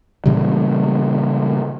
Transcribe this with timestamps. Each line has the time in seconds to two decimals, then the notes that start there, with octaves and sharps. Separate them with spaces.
0.26 A#2 C#3 E3 G3